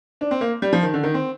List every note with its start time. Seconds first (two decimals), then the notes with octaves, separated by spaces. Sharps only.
0.21 D4
0.31 C4
0.41 A#3
0.62 G3
0.73 F3
0.83 D#3
0.94 D3
1.03 D#3
1.14 C4